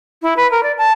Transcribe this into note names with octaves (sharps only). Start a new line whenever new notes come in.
E4
B4
A#4
D5
A5